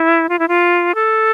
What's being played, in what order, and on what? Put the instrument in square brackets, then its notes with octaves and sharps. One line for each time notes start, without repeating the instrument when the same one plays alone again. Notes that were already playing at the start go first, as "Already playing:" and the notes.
Already playing: [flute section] E4
F4
E4
F4
A4